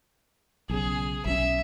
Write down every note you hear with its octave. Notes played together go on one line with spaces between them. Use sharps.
B1 C#3 G#4
B1 F3 C#4 E5